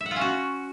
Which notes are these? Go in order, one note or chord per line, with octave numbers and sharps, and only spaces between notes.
E5
F#5
F4
C#4
F#4